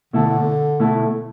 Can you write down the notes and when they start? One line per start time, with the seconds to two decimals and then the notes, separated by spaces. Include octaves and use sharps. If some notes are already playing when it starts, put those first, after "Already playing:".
0.13 B2 D3 A3 E4 A4
0.80 B2 A3 E4 A4